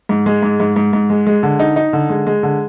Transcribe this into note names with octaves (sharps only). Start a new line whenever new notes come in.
G#2
G#3
G#2
G#2
G#2
G#2
G#3
G#3
D3
D#4
D#4
D3
G#3
G#3
D3